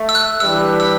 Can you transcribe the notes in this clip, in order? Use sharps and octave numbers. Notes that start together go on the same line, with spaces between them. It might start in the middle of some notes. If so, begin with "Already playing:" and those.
Already playing: A3
E6
F#6
E3 G3 D4 G4 B4 E6
E6